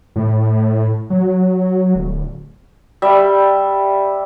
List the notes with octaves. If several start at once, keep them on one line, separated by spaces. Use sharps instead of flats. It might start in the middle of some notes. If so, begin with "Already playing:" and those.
A2
F#3
D1
G3 E5